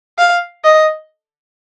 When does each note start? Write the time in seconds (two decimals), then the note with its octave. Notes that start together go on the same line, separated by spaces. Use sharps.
0.18 F5
0.64 D#5